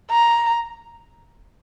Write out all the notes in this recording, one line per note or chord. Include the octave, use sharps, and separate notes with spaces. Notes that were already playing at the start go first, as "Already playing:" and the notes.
A#5